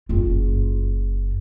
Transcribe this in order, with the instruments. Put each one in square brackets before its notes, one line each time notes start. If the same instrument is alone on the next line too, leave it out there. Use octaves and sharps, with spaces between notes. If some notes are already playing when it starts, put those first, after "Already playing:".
[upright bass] F#1 F4